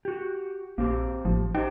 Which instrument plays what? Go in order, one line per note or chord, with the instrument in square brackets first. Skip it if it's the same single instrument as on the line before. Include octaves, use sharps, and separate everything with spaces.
[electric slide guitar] F#4 G4
[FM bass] A#1 [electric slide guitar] A#3 C4 G4
[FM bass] A1 [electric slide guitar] F3
[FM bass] D#4 [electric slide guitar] G4 C5 G5